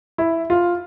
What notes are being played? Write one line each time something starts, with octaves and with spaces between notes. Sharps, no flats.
E4
F4